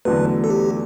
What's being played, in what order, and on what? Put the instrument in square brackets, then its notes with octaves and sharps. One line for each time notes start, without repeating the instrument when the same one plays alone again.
[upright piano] E2 D3 F#3 A3 [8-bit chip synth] B4
[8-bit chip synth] A4
G4